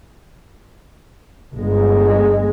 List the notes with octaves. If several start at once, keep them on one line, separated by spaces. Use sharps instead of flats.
G1 G#3